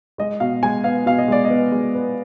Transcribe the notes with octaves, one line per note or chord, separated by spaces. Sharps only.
G#3 D#5
B2 F5
G#3 G#5
B3 F5
B2 F5
D#5
G#3 D5
D#5
B3
G#3
B3